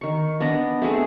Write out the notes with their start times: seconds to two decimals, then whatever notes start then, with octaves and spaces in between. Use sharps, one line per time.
0.01 D#3 C#6
0.40 B3 D4 D5 D#5
0.82 A3 C4 G#4